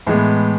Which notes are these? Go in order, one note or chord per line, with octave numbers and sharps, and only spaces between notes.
A2 E3 G#3 B3